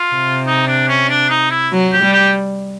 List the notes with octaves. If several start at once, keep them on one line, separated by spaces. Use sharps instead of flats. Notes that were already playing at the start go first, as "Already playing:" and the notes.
Already playing: F4
C3
D#4
D4
C#4
D4
D#4
E4
F#3
G4
G3
G4